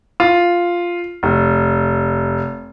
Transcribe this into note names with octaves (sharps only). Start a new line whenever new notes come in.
F4
F1